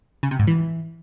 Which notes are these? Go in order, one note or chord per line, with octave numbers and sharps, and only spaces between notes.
C#3
C3
G#2
E3